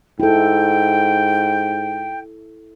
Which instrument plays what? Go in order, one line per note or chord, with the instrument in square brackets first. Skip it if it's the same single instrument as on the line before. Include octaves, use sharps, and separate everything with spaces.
[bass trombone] G#2 [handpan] E4 A4 [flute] G5